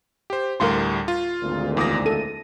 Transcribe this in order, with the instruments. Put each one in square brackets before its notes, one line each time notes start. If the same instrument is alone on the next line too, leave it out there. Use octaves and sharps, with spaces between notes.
[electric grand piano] G4 C5
[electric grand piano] D2 A2 G3 [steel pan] A#4 F5 C6
[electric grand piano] F4
[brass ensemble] G#1 D2 A#2
[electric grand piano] E2 D#6 A#6 [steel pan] E4 D6
[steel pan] A4 [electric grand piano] D#7